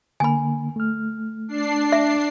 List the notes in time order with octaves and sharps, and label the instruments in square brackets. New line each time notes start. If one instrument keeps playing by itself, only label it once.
[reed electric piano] D3 A#3 [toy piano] G#5 B5
[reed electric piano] A3 F6
[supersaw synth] D4 C7
[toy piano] E5